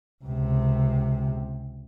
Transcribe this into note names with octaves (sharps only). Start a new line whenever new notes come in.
C#2 C3